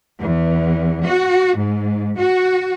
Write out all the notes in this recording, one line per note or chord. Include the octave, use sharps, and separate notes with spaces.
E2
F#4
G#2
F#4